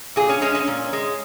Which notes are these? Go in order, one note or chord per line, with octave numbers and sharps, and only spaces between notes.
A#2 G#4
C#4
G#3 C#4
C#4
A#2
G#3